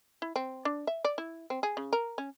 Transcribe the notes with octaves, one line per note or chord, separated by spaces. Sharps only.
E4
C4
D4
E5
D5
E4
C4
G#4
C#3
A#4
C#4